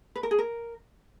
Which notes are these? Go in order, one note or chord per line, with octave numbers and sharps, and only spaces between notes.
B4
A#4
G#4
A#4